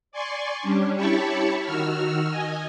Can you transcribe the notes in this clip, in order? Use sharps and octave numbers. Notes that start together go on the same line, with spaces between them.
D5 G#5 C6 C#6
G3 C#4 D4
E4 G4 C#5 A5 B5 C#6
D#3 F#4 E6 F6
D#5 G#5